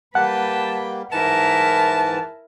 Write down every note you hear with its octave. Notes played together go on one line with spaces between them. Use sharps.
G3 A#3 B4 F#5 G5 A5
G#2 E3 E4 A#4 B4 A5